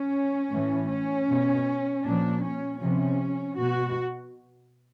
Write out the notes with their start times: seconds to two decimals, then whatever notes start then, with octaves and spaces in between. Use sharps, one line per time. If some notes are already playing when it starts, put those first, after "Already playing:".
Already playing: C#4
0.52 A2 E3
0.91 C#4
1.28 B2
2.04 A#2 F3 D4
2.43 C#4
2.81 C3 F3 C#4
3.57 B2 F#4